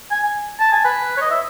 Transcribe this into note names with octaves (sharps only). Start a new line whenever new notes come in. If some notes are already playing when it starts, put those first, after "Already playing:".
G#5
A5
G#5
B4
C#5
D#5
E5